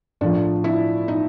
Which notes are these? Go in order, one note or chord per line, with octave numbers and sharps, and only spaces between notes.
A2 F3 A3 D4
E4
D#4